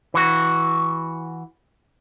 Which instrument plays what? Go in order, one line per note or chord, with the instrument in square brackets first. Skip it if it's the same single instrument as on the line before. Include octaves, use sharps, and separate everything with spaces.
[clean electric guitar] E3 F#4